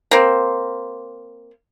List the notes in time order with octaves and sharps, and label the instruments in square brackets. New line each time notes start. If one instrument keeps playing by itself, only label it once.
[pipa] A#3 C4